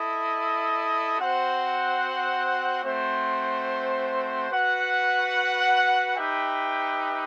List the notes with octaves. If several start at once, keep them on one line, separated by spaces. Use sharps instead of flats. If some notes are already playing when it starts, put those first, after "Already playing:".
Already playing: E4 A4 D#5
C4 F#4 C5 F#5
A3 C4 F#4 C5
F#4 B4 F#5
D#4 G4 B4 E5 G5